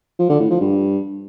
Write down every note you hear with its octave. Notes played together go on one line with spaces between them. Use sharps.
F3
D3
A2
F3
G2